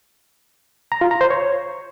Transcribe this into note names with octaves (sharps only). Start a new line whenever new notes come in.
A#5
F4
A#5
C5
C#5